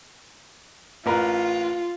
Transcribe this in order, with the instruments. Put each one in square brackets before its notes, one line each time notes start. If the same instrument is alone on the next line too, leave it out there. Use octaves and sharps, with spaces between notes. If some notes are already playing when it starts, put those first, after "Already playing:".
[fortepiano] A1 A#4 B4 [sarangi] F4